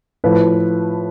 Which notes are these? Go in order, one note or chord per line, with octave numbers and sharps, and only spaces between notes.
A2 F3 B4